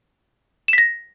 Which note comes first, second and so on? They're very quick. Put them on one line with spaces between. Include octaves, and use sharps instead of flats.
E7 B6 A#6